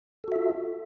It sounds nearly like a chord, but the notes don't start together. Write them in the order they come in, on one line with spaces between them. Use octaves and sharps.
A4 F#4 E5 F4